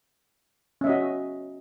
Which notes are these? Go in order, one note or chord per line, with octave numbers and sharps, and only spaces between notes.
C#4 F#4 D#5 E5